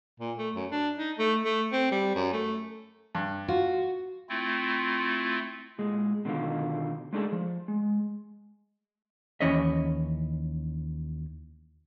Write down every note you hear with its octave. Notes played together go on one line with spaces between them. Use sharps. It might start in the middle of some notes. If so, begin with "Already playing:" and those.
A#2
A3
F#2
D4
D#4
A3
A3
C4
G3
F#2
A3
G2
F4 F#4
A3 C4 E4 F4
A#2 G#3
B2 D3 D#3 F4
G#3 A3 D4 D#4 G#4 A4
F3
G#3
D#2 E3 C#4 C#5 D#5 E5